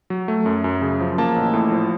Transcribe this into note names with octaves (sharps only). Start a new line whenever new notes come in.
F#3
A3
F#2
F#2
C#3
F3
A#3 A5
A1
A2
F3